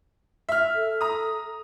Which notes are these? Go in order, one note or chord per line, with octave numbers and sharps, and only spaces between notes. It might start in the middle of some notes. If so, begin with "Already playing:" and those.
E5 F6
A4
A#5 D#6